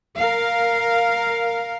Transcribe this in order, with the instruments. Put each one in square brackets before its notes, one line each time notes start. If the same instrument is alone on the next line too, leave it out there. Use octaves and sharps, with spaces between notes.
[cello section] A#4 F5